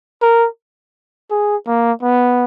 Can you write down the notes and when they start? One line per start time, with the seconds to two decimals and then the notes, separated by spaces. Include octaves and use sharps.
0.22 A#4
1.31 G#4
1.67 A#3
2.03 B3